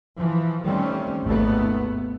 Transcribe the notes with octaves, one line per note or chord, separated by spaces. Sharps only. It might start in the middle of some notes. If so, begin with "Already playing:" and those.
E3 F3
D#3 G3 A3 C4 C#4
G#1 D#2 A3 B3